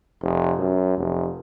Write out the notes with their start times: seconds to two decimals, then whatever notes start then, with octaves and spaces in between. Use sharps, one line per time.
0.22 F1
0.59 F#2
0.98 F1